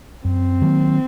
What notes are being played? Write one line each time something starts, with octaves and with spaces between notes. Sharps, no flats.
F#2 C4
D#3 F#3 A#3